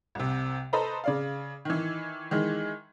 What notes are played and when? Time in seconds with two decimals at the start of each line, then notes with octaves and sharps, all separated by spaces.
0.15 C2 C3
0.73 A4 B4 C5 D#5 A#5 B5
1.04 C#3 D5 F5
1.65 D#3 E3
2.31 D#3 E3 G#3